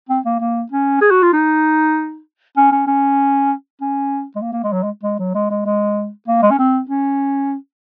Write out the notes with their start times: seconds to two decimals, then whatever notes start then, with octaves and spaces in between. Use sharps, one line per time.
0.09 C4
0.25 A#3
0.40 A#3
0.72 C#4
1.01 G#4
1.11 F#4
1.22 F4
1.33 D#4
2.57 C#4
2.72 C#4
2.87 C#4
3.81 C#4
4.36 G#3
4.42 A#3
4.53 A#3
4.63 G#3
4.73 F#3
4.83 G#3
5.03 G#3
5.19 F#3
5.35 G#3
5.50 G#3
5.66 G#3
6.28 A#3
6.43 G#3
6.51 C#4
6.59 C4
6.89 C#4